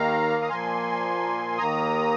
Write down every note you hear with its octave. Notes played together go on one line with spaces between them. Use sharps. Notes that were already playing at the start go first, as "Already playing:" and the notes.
Already playing: D#2 D#3 A#3 F5 A#5
D#6
A#2 F3 A#3 G#5 C6
D#2 D#3 A#3 A#5 D#6